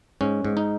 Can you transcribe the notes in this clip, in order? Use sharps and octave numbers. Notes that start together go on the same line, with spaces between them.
G#2 C#4
G#2
D#4